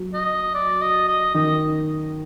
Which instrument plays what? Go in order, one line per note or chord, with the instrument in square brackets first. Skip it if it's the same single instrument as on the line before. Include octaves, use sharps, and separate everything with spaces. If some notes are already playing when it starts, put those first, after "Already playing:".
Already playing: [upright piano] F#3
[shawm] D#5
D5
D#5
D#5
[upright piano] D#3 [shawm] D#5